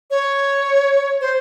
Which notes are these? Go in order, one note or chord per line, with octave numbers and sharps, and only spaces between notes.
C#5
C5